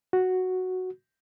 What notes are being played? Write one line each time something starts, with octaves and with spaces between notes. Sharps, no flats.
F#4